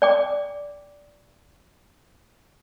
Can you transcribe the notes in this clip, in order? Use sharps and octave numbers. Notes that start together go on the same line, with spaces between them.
D5 G5 D6